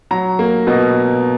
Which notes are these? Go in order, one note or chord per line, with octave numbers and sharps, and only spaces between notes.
F#3 A#5
A#3
B2 D#5